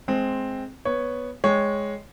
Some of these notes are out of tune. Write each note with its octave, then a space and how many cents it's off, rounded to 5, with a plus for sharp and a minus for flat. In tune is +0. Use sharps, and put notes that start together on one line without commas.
G#3 +20 C4 +0
B3 +0 C#5 +0
G#3 +0 C#5 +0 G5 +0